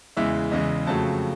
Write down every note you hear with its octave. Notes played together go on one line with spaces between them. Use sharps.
E2 C#3 E3 G#3 E5
E2 C#3 E3 G#3 D#5
F2 C#3 F#3 A3 A5